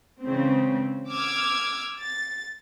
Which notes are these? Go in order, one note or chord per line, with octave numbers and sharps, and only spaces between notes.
C#3 E3 G#3 C4
D6 E6 F6 G#6
A6